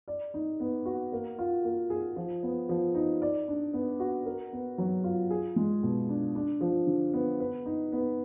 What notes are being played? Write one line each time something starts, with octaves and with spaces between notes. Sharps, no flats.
D5
D#4
B3
F#4
A#3
F4
A#3
G#4
F3
B3
F3
D#4
D5
D4
B3
F#4
A#4
B3
F#3
F4
G#4
G#3
B2
D4
D4
F3
D3
B3
B4
D#4
B3